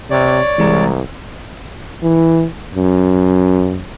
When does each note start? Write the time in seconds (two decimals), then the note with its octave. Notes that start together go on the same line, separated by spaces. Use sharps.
0.11 C3 C#5 D5
0.58 C2 E3 G#3 A#5
2.03 E3
2.75 F#2